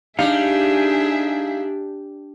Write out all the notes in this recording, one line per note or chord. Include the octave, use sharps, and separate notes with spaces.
G3 D4 D#4 G#4 E5 F5